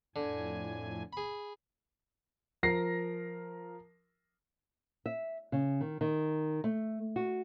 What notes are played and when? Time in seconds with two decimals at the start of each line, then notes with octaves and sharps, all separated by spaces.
0.16 F2 A2 D3 G#5
1.13 G#4 B5
2.63 F3 A#4 A#6 C7
5.06 E5
5.52 C#3
5.81 D#3
6.01 D#3
6.64 A3
7.16 F#4